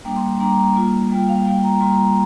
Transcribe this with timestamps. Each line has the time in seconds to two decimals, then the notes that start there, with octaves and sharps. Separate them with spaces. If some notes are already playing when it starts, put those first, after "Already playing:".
0.05 G3 A#3 D4 G5
0.16 C6
0.40 G3 A#3 D4 A#5
0.76 G3 A#3 F4
1.11 G3 A#3 F4 G5
1.29 F5
1.45 G3 A#3 F4 G5
1.64 A#5
1.81 G3 A#3 F4 C6
1.93 A#5